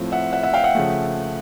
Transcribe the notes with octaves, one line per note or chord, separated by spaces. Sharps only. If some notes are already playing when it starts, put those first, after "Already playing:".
Already playing: A2 F3 A3 C4
E5 F#5
E5 F#5
E5 F#5
F5 G5
E5 F#5
C#3 F3 A3